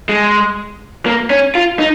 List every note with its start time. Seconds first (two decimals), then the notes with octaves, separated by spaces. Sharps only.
0.09 G#3
1.06 A#3
1.30 C#4
1.55 F4
1.79 D#4